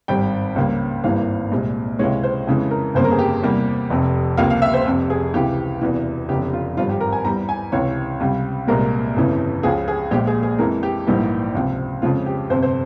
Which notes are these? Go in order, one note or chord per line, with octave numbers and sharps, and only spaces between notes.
G#1 G2 G3 G5
C#2 C#3 G3 A#3
G#1 G2 E3 A#3 F5
C2 A#2 G#3
C#2 C3 E3 G#3 C#5
C5
F2 C#3 E3 G#3
A#4
G1 F2 C#3 G3 A#3 C5
A#4
G#4
G4
E2 C3 G3 A#3
F1 F2 C3
C#2 C3 F3 A#3 F5
F5
E5
C5
F1 F2 C3
G#4
C#2 C3 E3 G4
E1 E2 C3 E3
F1 E2 C#3 G4
F4
G#1 G2 F3 F4
G4
A#4
G#5
E2 E3 G3 A#5
G#5
C#2 C3 E3 C#5
C#2 C3 G3
C2 A#2 G#3 A#4
G1 F2 C#3 E3
C#2 C#3 F3 G#4
G#4
A#1 A#2 G#3 G4
G#4
G#4
F2 E3 G#3 A#4
G4
A#1 G#2 E3 G3 A#3
C#2 C3 F3
F2 C#3 F3 G#3 F4
G4
G1 F2 C3 C5
C5